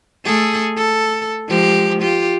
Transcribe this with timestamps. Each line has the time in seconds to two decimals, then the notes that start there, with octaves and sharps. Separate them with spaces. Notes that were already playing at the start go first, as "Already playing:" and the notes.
0.24 A3 G#4 A4
0.76 A4
1.48 F3 G#3 G4
2.01 F4 G4